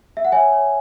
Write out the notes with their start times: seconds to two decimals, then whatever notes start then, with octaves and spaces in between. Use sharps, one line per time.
0.17 E5
0.25 F#5
0.32 C#5 E5 G#5
0.52 C#5